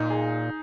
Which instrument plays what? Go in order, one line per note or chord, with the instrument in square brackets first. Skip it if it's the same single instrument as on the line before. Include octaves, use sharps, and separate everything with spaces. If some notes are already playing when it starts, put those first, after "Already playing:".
Already playing: [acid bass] A#2 [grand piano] D#4
[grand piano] G#4